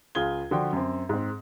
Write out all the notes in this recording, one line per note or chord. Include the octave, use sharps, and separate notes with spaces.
C#2 F4 G#4 G#6 G7
D3 F3 F#4 G5
F#2 C4
G#2 C4